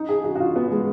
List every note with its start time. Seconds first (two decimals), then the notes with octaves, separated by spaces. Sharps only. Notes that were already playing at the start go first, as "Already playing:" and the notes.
Already playing: D#4
0.09 G#4
0.24 F#4
0.35 F#4
0.39 F4
0.56 B3
0.71 G#3